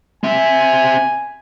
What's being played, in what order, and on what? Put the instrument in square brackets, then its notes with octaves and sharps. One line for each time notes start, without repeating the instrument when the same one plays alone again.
[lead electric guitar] C4 E5 [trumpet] G#5